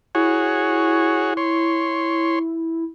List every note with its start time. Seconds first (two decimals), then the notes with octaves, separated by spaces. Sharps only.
0.15 E4 F#4 G#4 C#5
1.37 C#5 C6